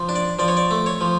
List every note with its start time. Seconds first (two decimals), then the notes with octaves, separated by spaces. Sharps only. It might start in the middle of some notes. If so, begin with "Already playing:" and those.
Already playing: F3
0.09 D4
0.15 D5
0.39 F3 D5
0.48 C#5
0.57 D5
0.71 A3
0.86 C#5
1.01 F3